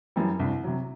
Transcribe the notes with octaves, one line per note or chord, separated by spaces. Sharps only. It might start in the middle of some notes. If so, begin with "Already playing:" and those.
F#2 E3 G3
C2
C3 F#3